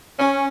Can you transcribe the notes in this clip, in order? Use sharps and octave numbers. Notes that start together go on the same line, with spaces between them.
C#4